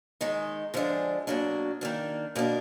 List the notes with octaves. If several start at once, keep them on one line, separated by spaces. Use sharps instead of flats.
D#3 G#3 D#4
D3 F3 G#3 D4
B2 F#3 A#3 D4
D#3 A#3 D4
B2 A#3 D4